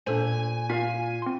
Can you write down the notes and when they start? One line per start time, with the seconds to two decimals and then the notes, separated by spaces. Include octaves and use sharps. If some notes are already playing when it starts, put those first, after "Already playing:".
0.07 A#2 D4 A4 C5 G#5
0.70 F4 F5 B6
1.22 C4 C6